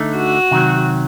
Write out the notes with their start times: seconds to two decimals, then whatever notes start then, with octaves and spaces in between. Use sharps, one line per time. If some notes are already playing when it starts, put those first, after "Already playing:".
Already playing: D3 A3 D#4
0.17 F#4
0.51 C3 D#3 F#3